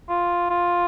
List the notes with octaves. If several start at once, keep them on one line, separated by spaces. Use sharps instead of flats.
F4
F4